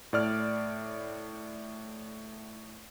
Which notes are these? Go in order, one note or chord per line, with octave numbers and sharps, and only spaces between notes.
A2 D5 F6